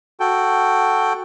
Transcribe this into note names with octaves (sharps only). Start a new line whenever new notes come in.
F#4 A4 G5